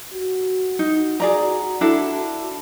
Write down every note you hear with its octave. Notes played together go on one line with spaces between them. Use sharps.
F#4
D#4
G#4 D5 A#5
D4 E4 A4